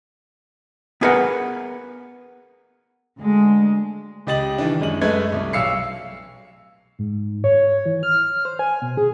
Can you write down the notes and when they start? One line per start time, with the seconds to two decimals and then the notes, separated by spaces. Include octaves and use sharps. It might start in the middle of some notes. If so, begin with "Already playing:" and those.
1.01 B3 E4 G#4 A#4 B4 F#5
3.19 D2 G#3
4.27 C#2 G4 D#5 A6 F#7
4.58 D#3 E3 D4
4.79 F#2 G#3 C#4 F#7
5.01 F#2 G#3 A3 B4 G#6
5.32 C2
5.53 B1 F5 E6 C7 C#7
6.99 G#2
7.44 C#5
7.86 E3
8.03 F6
8.45 C5
8.59 G#5
8.82 B2
8.97 G#4